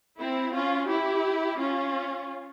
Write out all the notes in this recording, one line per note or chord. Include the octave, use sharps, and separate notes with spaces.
C4 E4
C#4 F4
E4 G4
C#4 F4